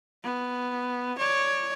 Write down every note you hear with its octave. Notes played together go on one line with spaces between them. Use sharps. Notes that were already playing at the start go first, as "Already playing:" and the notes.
B3
C#5 D5